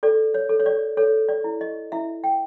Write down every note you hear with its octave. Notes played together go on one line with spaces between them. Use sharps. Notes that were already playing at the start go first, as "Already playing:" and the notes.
A4 D5
C#5
A4
C#5
D5
A4 C#5
D5
E4
D#5
E4 E5
G5